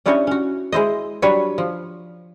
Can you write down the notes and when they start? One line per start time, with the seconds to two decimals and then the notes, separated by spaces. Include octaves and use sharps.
0.06 C#4 D4 E4 G4 C#5 D#5
0.27 C#4 F#4
0.72 G#3 E4 C5 D#5
1.22 F#3 G3 D4 B4 C#5
1.58 F3